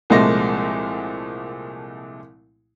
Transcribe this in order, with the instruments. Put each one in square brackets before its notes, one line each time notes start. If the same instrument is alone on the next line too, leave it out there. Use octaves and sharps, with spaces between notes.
[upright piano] C2 A#2 F3 G#3 A3 A#6